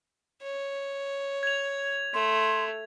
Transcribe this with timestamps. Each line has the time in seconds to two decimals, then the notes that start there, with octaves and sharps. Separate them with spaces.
0.42 C#5
1.43 G#6 F7
2.14 A3 C6